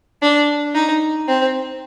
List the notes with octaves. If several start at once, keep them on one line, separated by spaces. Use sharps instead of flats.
D4
D#4
C4